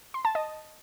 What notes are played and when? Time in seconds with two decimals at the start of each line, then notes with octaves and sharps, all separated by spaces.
0.14 C6
0.25 A5
0.35 D#5